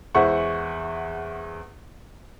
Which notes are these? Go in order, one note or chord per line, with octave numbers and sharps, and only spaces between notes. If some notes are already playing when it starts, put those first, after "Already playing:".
E2 G#3 E4 C5 F#5 C#6